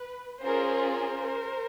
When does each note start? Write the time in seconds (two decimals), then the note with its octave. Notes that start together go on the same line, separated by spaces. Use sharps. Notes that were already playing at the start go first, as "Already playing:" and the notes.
Already playing: B4
0.42 C#4 F4 G#4 A#4 C5
0.93 A#4 C5